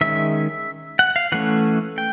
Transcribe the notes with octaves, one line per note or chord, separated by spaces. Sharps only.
D#3 G#3 C#4 E5
F#5
F5
E3 A3 C#4 F#5
G5